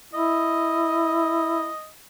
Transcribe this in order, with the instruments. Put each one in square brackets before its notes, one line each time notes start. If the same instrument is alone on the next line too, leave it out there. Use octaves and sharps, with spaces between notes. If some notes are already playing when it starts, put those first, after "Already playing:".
[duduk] E4 [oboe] D#5